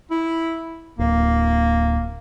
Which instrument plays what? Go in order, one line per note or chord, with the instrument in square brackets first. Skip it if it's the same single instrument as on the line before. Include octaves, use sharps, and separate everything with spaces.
[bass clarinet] E4
[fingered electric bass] D1 [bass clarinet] A#3